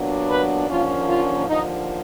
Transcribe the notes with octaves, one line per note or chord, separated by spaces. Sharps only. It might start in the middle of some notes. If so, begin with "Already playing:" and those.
Already playing: A#2 F#3 B3 D4
B4
D#2 D3 F3 A#3 C#4 F4
F4
D#2 D3 F3 D#4